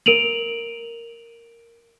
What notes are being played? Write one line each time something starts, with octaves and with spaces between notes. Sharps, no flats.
A#4 D7 D#7 F7 F#7